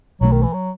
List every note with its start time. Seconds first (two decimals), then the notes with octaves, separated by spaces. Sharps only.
0.21 B1 B2 F#3 A3
0.32 D#3
0.43 E3
0.53 F#3